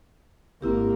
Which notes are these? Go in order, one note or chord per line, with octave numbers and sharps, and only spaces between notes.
G#1 A#3 C4 E4 G4